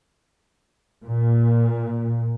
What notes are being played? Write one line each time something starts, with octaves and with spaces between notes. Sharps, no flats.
A#2